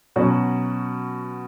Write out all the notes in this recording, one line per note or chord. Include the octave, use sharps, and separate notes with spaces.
B2 F#3 C#4 F#4